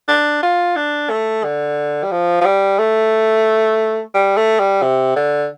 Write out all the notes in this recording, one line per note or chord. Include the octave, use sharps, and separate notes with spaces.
D4
F4
D4
A3
D3
G3
F3
F3
G3
A3
G3
A3
G3
C3
D3